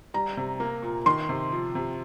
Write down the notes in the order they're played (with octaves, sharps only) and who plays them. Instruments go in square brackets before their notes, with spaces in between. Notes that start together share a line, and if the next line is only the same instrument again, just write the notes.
[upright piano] G3 [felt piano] A#5
[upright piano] C3
A#3
A#2
[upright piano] D#3 [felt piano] C6
[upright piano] C3
F3
C3